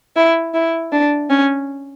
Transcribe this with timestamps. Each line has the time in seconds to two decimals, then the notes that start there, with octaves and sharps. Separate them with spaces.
0.16 E4
0.54 E4
0.92 D4
1.30 C#4